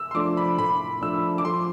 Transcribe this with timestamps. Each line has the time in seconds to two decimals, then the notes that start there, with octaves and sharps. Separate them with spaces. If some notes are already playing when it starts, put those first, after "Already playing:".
Already playing: E6
0.11 C6
0.15 F3 A3 D4 D6
0.37 B5
0.58 A2 B5
1.02 F3 A3 D4 E6
1.38 D6
1.45 F3 C6